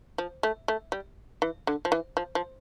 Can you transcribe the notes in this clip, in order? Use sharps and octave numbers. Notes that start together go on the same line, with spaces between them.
F3
A3
A3
G3
E3
D3
F3
E3
F3
F3